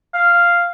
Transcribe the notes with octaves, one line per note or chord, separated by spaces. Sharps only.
F5